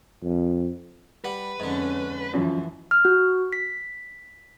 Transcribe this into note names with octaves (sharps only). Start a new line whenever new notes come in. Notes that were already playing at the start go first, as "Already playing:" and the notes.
F2
G3 B4 F#5
F2 G#2 D3 C#4
F#2 E3 F3
F6
F#4
B6